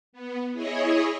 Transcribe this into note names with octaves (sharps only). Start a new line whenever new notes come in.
B3
E4 G#4 C#5 D#5